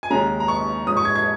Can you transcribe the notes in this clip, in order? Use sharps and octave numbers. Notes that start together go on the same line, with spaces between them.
G#5
D#2 C#3 G#3 C#4 A#5
A#5
C#6
G#2 F3 C#4 D#6
C#6
G#6
G#6